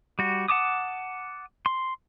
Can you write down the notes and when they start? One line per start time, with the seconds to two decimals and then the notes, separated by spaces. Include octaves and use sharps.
0.19 G3 F#4
0.48 F#5 A5 D6 D#6
1.66 C6